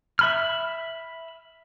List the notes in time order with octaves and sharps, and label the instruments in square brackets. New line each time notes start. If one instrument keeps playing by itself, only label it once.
[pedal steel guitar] E5 B5 F6